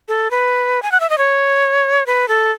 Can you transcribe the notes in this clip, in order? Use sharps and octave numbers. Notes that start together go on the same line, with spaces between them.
A4
B4
G#5
F#5
E5
D#5
C#5
B4
A4